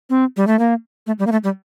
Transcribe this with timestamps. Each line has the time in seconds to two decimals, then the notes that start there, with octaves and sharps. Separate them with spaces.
0.10 C4
0.37 G3
0.47 A3
0.59 A#3
1.07 A3
1.19 G3
1.27 A#3
1.32 A3
1.44 G3